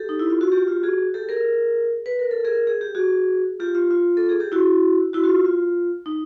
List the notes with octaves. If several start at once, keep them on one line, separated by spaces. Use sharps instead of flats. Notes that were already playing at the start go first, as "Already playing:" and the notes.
Already playing: G4 A4
D#4
E4
F4
F#4
F4 G4
F4 G4
F#4 G#4
G4 A4
G#4 A#4
B4
A#4
A4
G#4 A#4
G#4
G4
F#4 G#4
F4 G4
F4
F4
A4
G#4
G4
E4 F#4
E4 F#4
F#4
F4
F4
D#4